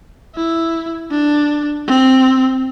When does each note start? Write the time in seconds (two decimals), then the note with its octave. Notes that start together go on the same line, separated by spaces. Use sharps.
0.35 E4
1.11 D4
1.87 C4